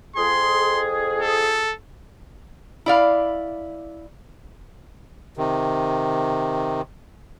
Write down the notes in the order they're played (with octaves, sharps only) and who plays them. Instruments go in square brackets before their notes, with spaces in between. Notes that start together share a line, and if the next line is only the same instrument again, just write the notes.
[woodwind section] F2 G#4 [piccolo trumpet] C6
[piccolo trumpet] A4
[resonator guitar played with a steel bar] E4 D5 F5
[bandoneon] C3 D#3